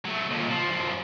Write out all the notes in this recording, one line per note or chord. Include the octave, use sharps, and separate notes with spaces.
F#3 A3
D#2 A#2
F3
F#2 F3